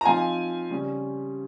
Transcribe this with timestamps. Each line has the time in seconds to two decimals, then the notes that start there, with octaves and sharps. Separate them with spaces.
0.01 A#5
0.05 F3 C4 D#4 F5 G#5
0.70 C#3 G3 C#4